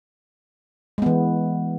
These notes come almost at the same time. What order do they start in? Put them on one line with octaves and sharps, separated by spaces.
G#3 B3 E3